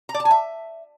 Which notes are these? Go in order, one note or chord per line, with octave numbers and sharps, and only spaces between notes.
A#5
D5
A5
G#5
E5